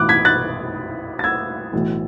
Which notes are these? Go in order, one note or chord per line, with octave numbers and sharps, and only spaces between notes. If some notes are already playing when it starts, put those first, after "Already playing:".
Already playing: B1 A2 E3 D6 F#6
G#6 B6
F#6 A6
A6
E6 G#6
B1 A2 E3